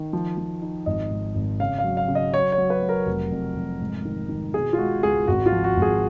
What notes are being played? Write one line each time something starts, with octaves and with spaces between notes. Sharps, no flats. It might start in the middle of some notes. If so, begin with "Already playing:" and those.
Already playing: D#3
F3
F3
D#4
G#1 D#5
G#2
G#1
C#3 F5
F5
F#3
F5
C#3
D#5
F#3 C#5
C#5
F#3
B4
F#3
A#4
F1
F2
F1
G#2
D#3
D#3
B2 G#4
F4
G#3 F#4
C#2 G#4
G#1 F#4
F4
F3
F#4
G#1
G#4